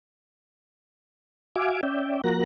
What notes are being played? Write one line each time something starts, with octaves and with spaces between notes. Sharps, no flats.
F#4 E5 F5 G#5 D6
C#4 D5 E5 G5
F3 A#3 F#4 A#4 F#6 A#6